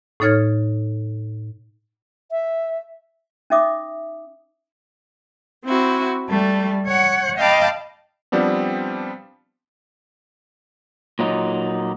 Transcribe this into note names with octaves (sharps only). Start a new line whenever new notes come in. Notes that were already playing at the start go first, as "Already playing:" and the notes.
A2 D#4 A4 C#5 F6 G#6
E5
C#4 D#4 E5 D6 D#6
C4 E4 F#4
G3 A3
C#5 F#5
D#5 F5 G5 A5 B5 D6
F3 G3 B3 C4 D4
A#2 F#3 D#4